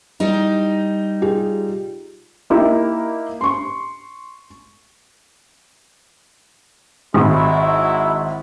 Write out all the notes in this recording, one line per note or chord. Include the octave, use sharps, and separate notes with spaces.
G3 D#4
F4 G4 G#4
A#3 D#4 E4 G4
C6 C#6
G#1 F#3 G#3 E4